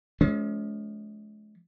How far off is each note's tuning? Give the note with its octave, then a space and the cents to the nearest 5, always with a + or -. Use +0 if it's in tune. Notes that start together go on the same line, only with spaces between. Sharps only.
F3 +0 G#3 +45 C#4 +30